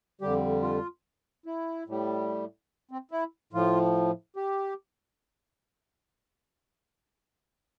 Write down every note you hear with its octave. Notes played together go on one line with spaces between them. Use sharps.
F2 D3 G3 G4
F4
E4
A2 G3
C4
E4
A2 F3 F4
G4